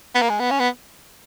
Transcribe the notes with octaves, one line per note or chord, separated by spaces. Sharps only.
B3
A#3
G#3
B3
C#4
B3